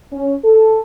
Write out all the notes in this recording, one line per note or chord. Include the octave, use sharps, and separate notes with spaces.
C#4
A4